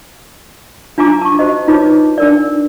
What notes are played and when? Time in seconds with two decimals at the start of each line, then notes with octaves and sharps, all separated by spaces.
0.98 D4 F4 G#5 A#5 D6
1.21 A5 C#6
1.39 F#4 C5 D#5
1.68 D#4 F4 B4 C#5 A5 D6
2.18 D4 A#4 D5